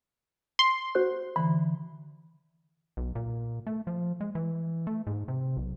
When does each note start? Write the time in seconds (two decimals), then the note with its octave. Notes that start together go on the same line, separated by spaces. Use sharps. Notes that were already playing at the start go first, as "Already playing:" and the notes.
0.59 C6
0.95 F#4 C5 F#6
1.36 D3 E3 B5
2.97 B1
3.15 A#2
3.67 A3
3.87 F3
4.21 G#3
4.35 E3
4.87 A3
5.07 G#2
5.28 C3
5.57 B1